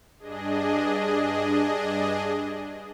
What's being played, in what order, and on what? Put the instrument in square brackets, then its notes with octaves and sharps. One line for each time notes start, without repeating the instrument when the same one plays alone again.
[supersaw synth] G2 D4 G#4 D#5